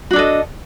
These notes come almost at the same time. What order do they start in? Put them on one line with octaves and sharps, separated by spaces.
F#4 D4 A4 D#5